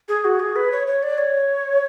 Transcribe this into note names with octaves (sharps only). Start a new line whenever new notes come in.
G#4
F#4
G#4
B4
C#5
C#5
D5
C#5